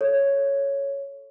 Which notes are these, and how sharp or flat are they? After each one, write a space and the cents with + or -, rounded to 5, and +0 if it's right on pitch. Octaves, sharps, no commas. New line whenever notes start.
A4 +0 C#5 +0